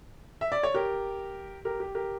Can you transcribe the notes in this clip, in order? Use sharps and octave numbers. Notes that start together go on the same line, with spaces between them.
E5
D5
C#5
G4 A#4
G4 A#4
G4
G4 A#4